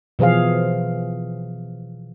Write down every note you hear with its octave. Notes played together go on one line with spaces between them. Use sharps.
B2 E3 F3 G#4 F5